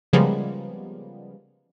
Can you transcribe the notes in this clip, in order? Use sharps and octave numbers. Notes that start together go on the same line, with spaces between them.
C#3 F3 G3 G#3 A#3 B3